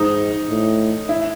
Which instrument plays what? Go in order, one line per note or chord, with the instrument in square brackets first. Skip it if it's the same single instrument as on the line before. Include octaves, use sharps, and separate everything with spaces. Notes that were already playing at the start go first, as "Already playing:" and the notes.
Already playing: [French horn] G#2 [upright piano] D#4
[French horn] A2
[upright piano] E4